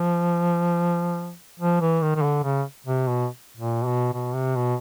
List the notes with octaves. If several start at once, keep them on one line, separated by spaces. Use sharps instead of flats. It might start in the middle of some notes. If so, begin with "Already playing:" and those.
Already playing: F3
F3
E3
D#3
D#3
D3
C#3
C3
B2
A#2
B2
B2
C3
B2